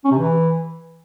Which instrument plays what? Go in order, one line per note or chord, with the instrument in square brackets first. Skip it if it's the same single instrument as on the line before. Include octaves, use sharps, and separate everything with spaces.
[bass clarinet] C#4
C3
E3